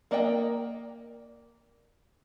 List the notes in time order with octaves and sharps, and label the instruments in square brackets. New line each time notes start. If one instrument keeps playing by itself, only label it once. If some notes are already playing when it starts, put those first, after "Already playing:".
[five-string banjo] A#3 A#4 D5 D#5 G5